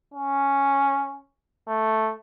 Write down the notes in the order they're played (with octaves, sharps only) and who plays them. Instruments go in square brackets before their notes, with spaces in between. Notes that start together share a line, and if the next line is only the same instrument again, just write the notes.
[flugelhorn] C#4
A3